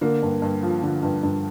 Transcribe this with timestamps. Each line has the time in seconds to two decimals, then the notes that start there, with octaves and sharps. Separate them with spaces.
0.01 D3 A#3
0.22 G2
0.42 G2
0.63 F3
0.82 D3
1.03 G2
1.23 G2